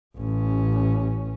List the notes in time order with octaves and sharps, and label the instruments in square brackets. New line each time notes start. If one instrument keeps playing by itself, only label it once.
[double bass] A1 C#4